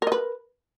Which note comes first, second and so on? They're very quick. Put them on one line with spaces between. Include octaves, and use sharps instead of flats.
A#4 D#5 B4